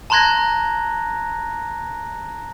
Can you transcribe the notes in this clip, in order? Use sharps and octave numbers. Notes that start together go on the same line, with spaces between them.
A5 A#5 C6 F#6 G#6 A#6